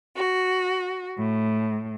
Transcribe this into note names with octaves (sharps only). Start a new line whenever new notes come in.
F#4
A2